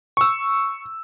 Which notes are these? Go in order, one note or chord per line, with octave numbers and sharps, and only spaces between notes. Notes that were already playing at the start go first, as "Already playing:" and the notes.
C#6 E6